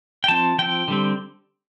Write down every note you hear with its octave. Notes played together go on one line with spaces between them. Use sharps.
G5
F3 C4 A5
F3 C4 G5
D3 G3 C4